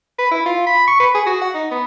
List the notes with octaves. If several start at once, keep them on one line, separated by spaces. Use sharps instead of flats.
B4
E4
F4
B5
C#6
B4
G#4
F#4
F#5
D#4
B3